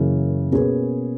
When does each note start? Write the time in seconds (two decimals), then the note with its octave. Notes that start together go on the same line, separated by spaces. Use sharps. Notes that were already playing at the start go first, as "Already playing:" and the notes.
Already playing: F#2 C#3 E3 A#3
0.52 B2 A#3 C#4 G#4 B4